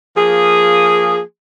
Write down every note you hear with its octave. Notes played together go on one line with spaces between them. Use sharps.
F3 A#3 G#4